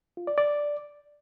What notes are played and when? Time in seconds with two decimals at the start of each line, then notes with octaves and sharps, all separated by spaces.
0.17 F4
0.27 D5
0.38 D5